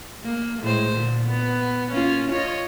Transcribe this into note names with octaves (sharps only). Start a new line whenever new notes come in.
A#3
A2 G#3 C5
A#2 D3
B3
A#3 C#4 F4
F4 C#5 D#5